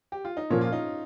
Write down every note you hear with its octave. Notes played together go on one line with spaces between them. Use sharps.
G4
F4
D#4
A#2 F3 A#3 C#4
F4
D#4